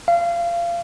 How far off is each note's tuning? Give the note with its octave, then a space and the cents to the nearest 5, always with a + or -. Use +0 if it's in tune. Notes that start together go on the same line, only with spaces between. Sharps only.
F5 -25